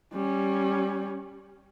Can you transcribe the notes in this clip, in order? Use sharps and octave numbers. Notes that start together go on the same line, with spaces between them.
G3 C#4